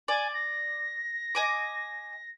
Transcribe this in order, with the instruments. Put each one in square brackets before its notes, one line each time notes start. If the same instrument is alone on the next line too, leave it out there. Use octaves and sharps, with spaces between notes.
[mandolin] D5 [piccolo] G#5
[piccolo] A#6
[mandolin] D#5 G#5 D6